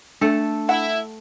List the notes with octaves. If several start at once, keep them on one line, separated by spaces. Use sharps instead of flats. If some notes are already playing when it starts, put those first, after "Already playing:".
A3 D4 A4
E4 F#5